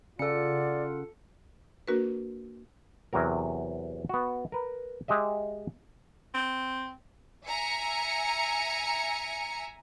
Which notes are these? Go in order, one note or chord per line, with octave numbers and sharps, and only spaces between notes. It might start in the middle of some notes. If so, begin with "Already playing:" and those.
C#3 F4 A4 D5 F#5 C#7
A#3 D4 F#4 A#4 B4
E2 C3 F#3 A#4
B3 F#4
A#4 B4
G#3 G4 D#5 E5
C4
E5 G#5 A#5 C#7